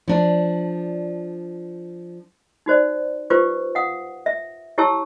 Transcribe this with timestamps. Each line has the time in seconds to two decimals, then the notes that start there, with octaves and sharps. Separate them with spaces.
0.08 F3 D4
2.66 D#4 F#4 C5 D5
3.30 F4 G4 B4 C5 D6
3.75 F5 F#5 D#6
4.26 E5
4.78 E4 G4 C#5 A5 C#6 E6